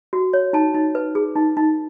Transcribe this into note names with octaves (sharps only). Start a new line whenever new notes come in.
F#4
C#5
D#4 A5
D#4
B4
G#4
D#4
D#4